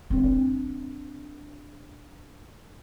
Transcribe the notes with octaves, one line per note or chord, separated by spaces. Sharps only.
C4 D4